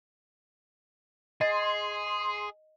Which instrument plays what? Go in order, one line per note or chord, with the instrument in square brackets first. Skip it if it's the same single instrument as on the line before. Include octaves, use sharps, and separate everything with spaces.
[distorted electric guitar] G#4 [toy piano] D#5 [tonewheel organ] C6